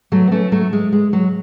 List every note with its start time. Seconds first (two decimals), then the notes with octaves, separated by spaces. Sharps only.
0.12 F#3 A3
0.27 B3
0.32 A3 C#4
0.52 F#3 A3
0.73 G#3
0.92 G#3
1.13 F#3